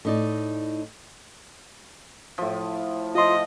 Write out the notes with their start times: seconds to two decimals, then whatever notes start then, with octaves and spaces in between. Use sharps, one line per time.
0.05 A2 D#4 D5
2.38 A2 F3
3.15 F3 F4 D#5 C6